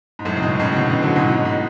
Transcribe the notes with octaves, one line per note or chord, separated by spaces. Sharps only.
G#2
F#2 A2
C#3
G#2 B2
A2 C#3
C#3
B2 D3
C#3 E3
D3 F#3
G#2 B2
G#2 B2
A2